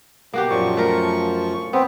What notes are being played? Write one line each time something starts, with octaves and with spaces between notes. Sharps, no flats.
B2 A#3 F#4 G4
F#2 A#2 F3 C#6
A3 A#4
B3 C4